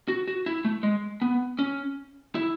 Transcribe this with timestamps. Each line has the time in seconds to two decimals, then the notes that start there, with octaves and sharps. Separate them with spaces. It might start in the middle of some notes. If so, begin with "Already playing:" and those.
0.08 F#4
0.28 F#4
0.46 E4
0.65 A3
0.83 G#3
1.22 B3
1.59 C#4
2.35 E4